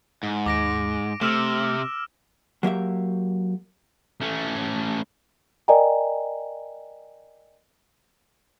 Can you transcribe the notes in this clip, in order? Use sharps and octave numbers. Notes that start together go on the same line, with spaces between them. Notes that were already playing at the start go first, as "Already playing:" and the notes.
G#2
D#2 D6 A#6 D7
C3 A3 E6 F6 E7
F#3 A#3 G4 E5
A3 C#4
A#4 D5 D#5 G5 G#5 A#5